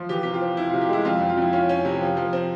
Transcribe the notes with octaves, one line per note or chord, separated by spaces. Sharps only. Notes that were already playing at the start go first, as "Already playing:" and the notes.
Already playing: F3
E3 G4
C3 G4
F4
C4
C3 E4
C3 F4
G4
G#3 E4
F2 F4
F2
F4
F2 E4
C#4 F4
C#4
C3
F3
F3
C4